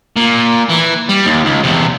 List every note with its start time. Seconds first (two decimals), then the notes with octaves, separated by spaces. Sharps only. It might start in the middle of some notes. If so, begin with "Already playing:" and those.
0.17 A#2
0.69 E3
1.09 G3
1.25 D#2
1.45 C#2
1.63 E2 C3